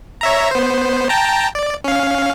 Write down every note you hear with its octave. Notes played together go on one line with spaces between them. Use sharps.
C#5 E5 A#5
B3 C5
G5 A5 A#5
D5
C#4 F5